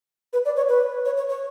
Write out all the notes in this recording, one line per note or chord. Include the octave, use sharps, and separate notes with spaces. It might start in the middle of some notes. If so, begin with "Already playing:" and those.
B4
D5
C#5
B4
C#5
C#5
C#5